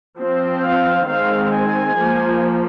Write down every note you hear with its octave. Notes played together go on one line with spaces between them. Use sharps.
F3 C4
F5
D#3 G#3 C4 F5
G#5
F3 A#3